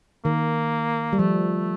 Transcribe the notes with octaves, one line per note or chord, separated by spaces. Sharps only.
D#3 A#3
G3
F3 A3